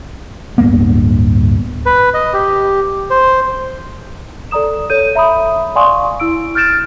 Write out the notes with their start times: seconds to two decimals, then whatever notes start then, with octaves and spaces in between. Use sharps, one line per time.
0.58 D1 G2 A#3 B3
1.86 B4
2.14 D#5
2.33 G4
3.10 C5
4.51 A4 D5 A#5 D#6 E7
4.90 A4 C#5 G6 D#7
5.15 E5 A#5 B5 D#6
5.75 D5 F5 G#5 C6 C#6 D#6
6.20 E4 E6 D7
6.55 F6 G6 A6 D7 E7